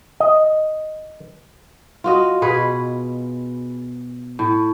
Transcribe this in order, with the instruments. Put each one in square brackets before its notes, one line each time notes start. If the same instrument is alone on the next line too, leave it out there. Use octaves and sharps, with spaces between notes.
[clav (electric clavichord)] D#5
[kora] F4 F#4 D#5
B2 G#4 B4
A2